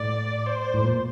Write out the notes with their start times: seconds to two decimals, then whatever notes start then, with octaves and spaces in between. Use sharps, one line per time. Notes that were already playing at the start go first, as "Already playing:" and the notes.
Already playing: A2 D5
0.46 C5
0.74 A2
0.84 A#2